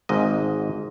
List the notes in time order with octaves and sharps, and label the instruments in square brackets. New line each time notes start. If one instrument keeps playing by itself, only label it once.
[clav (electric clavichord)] G#1 G#2 D#5